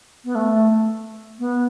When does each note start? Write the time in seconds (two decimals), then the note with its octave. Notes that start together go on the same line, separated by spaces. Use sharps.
0.25 B3
0.35 A3
1.39 B3